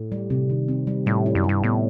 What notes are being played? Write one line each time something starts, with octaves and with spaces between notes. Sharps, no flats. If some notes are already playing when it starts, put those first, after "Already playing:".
Already playing: A2
G3
C3
D#3
C4
G3
A2 G3
E4
F#2
G3
G2
A2 B3